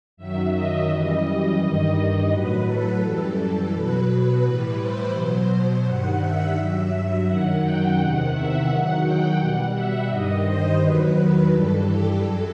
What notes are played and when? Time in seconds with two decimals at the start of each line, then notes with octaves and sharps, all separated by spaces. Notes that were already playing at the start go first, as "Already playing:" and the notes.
0.17 F#2 D#3 F#3 E5
0.52 D#5
0.88 F#2 E3 G3
1.59 G2 D#3 G3 D#5
2.29 A2 F#3 B4
2.65 A4
3.00 F#2 E3 G3
3.71 B2 F#3 B4
4.42 A2 E3 G3
4.77 C5
5.13 B2 F#3
5.83 G2 D#3 G3 F#5
6.19 E5
6.54 G2 F#3
7.25 F#2 D#3 F#3 F#5
7.61 G5
7.96 E2 C3 D#3 F#5
8.31 E5
8.66 E2 D#3 F#3 F#5
9.02 G5
9.37 B2 G3 F#5
9.73 E5
10.08 G2 D#3 G3 D#5
10.44 C5
10.78 E2 D#3 F#3 B4
11.50 G2 E3 G3 A4
11.85 G4
12.21 F#2 F#3 A4